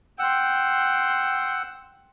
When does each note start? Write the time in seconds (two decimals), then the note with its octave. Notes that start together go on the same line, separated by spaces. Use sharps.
0.19 F#5 G5 C6 E6